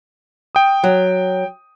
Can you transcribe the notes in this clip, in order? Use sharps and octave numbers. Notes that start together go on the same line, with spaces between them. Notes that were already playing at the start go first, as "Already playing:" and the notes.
G5 D#6
F#3